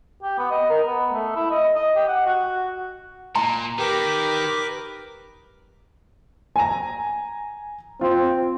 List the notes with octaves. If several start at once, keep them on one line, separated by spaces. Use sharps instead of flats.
G4
B3
D#5
A#4
B3
A3
E4
D#5
D#5
G4
F#5
F#4
A#2 A#5
D#3 G4 A#4 B4 D6
G#5 A#5
C4 F4